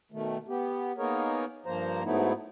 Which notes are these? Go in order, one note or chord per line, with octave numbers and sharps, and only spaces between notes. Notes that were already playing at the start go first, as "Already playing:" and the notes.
B2 D#3 A3
B3 G4
A#3 B3 D#4 G#4 A#4 C#5
G2 F3 A#3 C5 A#5
G#2 F#3 A3 B3 D#4 E4